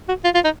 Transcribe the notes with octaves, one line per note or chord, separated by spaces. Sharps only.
F#4
F4
F4
D#4